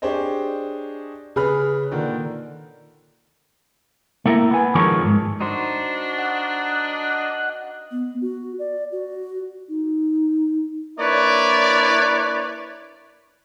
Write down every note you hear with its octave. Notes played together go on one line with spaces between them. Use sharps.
D4 G4 G#4 C5 C#5 D#5
C#3 G#4 B4 B5 F6
A#2 D3 D#3
A3 A#3 E4 A#4
B3 G#5
D#3 F3 G#3 A4 A#4 C#5
E2 G#2
D4 D#4 F#4 C5
D#5 F#5
B3
F#4
D5
F#4
D#4
A#3 D4 E4 B4 C#5 D5